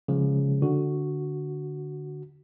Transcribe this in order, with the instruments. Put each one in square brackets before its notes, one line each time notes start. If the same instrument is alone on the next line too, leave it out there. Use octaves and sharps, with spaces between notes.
[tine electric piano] C#3 F3 G#3
[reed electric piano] D3 [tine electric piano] F#4